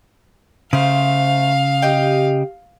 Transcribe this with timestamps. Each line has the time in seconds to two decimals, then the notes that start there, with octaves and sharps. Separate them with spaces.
0.73 C#3 A3 C5 F5
1.82 G4 D#5 G5